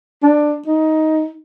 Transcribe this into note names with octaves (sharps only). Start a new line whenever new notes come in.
D4
D#4